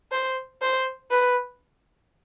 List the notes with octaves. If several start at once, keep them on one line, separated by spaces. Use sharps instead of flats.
C5
C5
B4